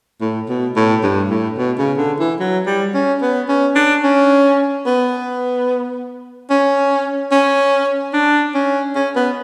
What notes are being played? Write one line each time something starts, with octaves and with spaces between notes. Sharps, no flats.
A2
B2
A2
G2
A2
B2
C#3
D3
E3
F#3
G3
C#4
B3
C#4
D4
C#4
B3
C#4
C#4
D4
C#4
C#4
B3